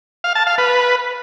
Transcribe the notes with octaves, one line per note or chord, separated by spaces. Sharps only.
F5
A5
F5
B4